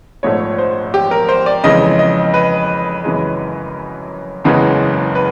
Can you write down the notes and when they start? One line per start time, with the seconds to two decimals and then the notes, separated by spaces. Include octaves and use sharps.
0.23 A#1 G#2 F3 A3 C#5
0.58 C5
0.94 G4
1.11 A#4
1.29 C5
1.46 D5
1.64 F2 C#3 E3 G#3 D#5
1.99 D#5
2.34 B4
3.04 F#2 C#3 E3 G#3
4.44 F#1 E2 C#3 E3 G#3
5.15 B4